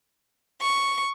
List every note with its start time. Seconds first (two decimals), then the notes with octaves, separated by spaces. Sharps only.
0.61 C#6